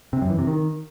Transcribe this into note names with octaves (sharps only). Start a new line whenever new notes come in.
C3
F#2
E3
C3
D#3